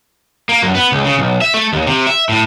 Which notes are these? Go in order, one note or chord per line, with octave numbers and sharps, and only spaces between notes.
A#3
F#2
B3
C#2
C#3
B1
E5
A3
D#2
C3
E5
A2